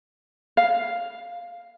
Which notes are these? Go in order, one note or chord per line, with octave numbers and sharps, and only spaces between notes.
F5